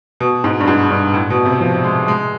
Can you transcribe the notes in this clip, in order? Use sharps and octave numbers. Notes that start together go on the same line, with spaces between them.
B2
G#2
G2
G#2
G2
A2
B2
C3
F3
G#3
G#3